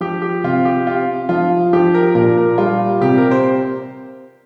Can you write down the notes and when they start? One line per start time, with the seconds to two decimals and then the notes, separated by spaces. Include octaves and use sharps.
0.01 F3 G4
0.22 G4
0.44 C3 F4
0.65 G4
0.86 C4 F4
1.29 F3 F4
1.73 F3 G4
1.95 A#4
2.15 A#2 A#4
2.37 A#4
2.58 G3 F4
3.01 C3 G4
3.18 A#4
3.31 C5